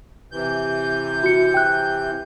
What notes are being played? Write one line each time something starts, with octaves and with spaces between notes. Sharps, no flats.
C3 E3 G6
F#4 C#7
G5 F#6